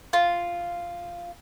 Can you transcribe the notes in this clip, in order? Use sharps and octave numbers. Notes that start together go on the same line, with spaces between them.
F4